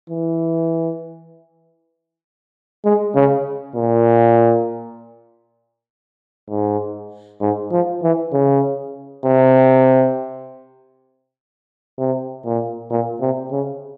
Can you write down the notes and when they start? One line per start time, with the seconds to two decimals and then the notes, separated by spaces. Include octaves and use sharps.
0.10 E3
2.85 G#3
3.15 C#3
3.75 A#2
6.50 G#2
7.41 G#2
7.72 F3
8.03 E3
8.33 C#3
9.25 C3
11.98 C3
12.45 A#2
12.90 A#2
13.20 C3
13.51 C#3